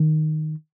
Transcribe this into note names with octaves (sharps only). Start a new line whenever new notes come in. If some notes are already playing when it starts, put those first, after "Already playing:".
Already playing: D#3